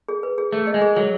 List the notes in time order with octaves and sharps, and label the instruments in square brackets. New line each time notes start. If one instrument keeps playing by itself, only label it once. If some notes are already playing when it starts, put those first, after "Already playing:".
[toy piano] G#4
B4
G#4
[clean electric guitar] A3 [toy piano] G#4
[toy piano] D#5
[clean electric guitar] G#3
[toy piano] G#4
[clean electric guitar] F#3 [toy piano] G#4